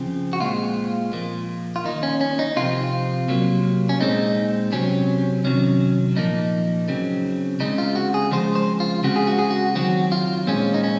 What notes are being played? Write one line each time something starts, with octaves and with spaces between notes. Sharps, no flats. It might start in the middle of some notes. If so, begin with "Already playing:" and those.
Already playing: C#3 F3 C4
F#4
A#2 G#3 C4 F4
A#2 F3 A#3
F4
D#3 A#3 D#4
C#4
C#4
D#4
C3 F3 C4 F4
C3 F#3 A#3
C#4
A#2 G#3 C4 D#4
C3 F#3 C4 C#4
C3 D#3 F#3 C#4
A#2 F3 A#3 D#4
C#3 F#3 C4
C#3 G#3 C4 D#4
F4
F#4
G#4
C#3 F3 G#3 C4 C5
C5
F4
C#3 G#3 C4 F#4
G#4
F#4
G#4
F#4
D#3 F#3 C4 F#4
F4
A#2 G#3 C4 C#4
D#4
C#4